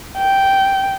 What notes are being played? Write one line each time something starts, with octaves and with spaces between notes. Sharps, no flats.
G5